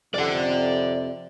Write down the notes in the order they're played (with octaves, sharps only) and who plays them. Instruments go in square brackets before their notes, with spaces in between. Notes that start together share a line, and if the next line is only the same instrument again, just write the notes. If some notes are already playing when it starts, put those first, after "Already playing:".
[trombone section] F2 C3 [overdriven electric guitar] D5 F#5